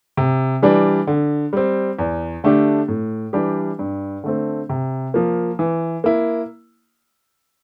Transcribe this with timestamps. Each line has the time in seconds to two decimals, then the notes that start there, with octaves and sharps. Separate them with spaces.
0.17 C3
0.62 E3 G3 D4
1.07 D3
1.53 G3 C4
1.99 E2
2.44 D3 A3 D4 G4
2.88 A2
3.33 E3 G3 D4 G4
3.79 G2
4.24 D3 A3 C4
4.70 C3
5.14 F3 A#3
5.59 E3
6.04 A#3 E4